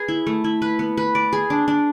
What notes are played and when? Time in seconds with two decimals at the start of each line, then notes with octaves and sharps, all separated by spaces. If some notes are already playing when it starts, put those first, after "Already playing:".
Already playing: G#4 B4
0.08 E4
0.27 A3
0.44 E4
0.62 B4
0.79 B3
0.97 B4
1.15 D5
1.33 G#4
1.50 D4
1.68 D4